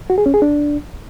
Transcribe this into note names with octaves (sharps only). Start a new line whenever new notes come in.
F#4
G#4
C#4
G#4
D4